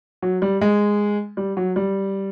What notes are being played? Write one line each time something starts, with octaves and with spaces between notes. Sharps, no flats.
F#3
G3
G#3
G3
F#3
G3